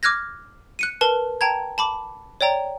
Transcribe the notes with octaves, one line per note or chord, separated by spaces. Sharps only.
D6 F6 F#6 G#6 A#6
F#6 C#7 D#7
A#4 B4 A5
G5 A5 A#5 G#6
A5 B5 D6
C#5 D5 G5 A#5